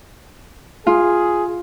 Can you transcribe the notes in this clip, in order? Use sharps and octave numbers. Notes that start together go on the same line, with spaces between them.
F4 G#4